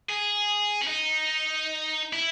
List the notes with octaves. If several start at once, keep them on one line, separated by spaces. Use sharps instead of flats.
G#4
C#4
D#4
E4